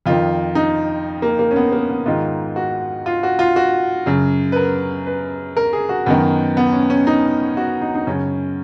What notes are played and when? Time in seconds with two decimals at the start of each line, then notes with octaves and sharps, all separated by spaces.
0.06 F2 D#3 F4
0.55 D#4
1.22 A#3
1.39 A#3
1.51 C#4
1.56 B3
1.72 A#3
1.90 B3
2.06 G#2 D#3 F4
2.56 F#4
3.06 F4
3.23 F#4
3.39 F4
3.56 F#4
4.06 F#2 C#3
4.52 B4
4.56 A#4
5.06 B4
5.57 A#4
5.73 G#4
5.89 F#4
6.06 F#2 D#3 B3
6.57 B3
6.73 C#4
6.90 C#4
7.07 D#4
7.57 F#4
7.81 D#4
7.94 D#4
8.07 F#2 C#3 C#4